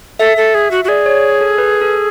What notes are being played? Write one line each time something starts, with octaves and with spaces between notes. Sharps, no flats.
A4 E5
A4
G#4
F#4
F#4
G#4 D5
C#5
A4
B4
A4